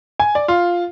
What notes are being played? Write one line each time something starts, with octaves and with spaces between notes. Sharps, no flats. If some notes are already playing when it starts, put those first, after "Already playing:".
G#5
D5
F4